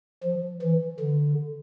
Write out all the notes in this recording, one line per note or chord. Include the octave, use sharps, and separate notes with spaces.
F3
E3
D3